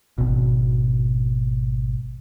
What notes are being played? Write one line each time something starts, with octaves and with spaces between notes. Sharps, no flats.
G#1 B2